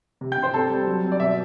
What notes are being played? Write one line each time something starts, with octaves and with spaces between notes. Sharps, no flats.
C3
G5 G6
C3
C5 C6
C4 A4 A5
G3
F#3
C4
D5
B2 E5